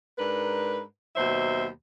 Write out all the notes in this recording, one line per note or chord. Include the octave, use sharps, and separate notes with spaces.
G#2 D4 A#4 B4
D#2 B2 F#3 C5 E5